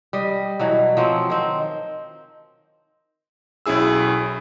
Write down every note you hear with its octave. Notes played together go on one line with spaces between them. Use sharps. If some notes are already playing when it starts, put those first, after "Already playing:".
G3 D#5
B2 E3 F#3
F3 F#3 C4
D#3 C4
B1 C#4 E4 G#4 E6